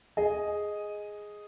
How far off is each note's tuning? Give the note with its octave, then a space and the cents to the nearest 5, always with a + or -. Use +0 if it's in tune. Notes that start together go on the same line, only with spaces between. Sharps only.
G#4 +0 D#5 +0